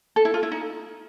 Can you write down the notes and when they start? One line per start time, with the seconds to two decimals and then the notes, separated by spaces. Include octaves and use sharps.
0.16 A4
0.25 E4
0.34 F4
0.43 E4
0.52 D#4